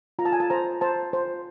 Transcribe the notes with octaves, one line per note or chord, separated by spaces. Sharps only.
F4 A#5
A5
G#5
A5
C5 A#5
C5 A5
C5